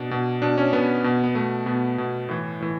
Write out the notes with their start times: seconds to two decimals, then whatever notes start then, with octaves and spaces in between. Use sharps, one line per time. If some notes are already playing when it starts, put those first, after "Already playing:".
Already playing: B2 D4
0.11 B2
0.42 B2 D4
0.58 C#4
0.73 B2 B3
1.04 B2
1.24 B3
1.35 B2 A3
1.66 B2 B3
1.98 B2
2.29 A2 E3
2.61 A2 E3